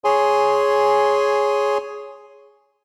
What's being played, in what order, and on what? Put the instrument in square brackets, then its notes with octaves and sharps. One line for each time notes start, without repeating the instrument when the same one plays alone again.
[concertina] G#4 C#5 G#5 C6